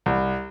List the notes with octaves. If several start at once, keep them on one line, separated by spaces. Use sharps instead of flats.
C2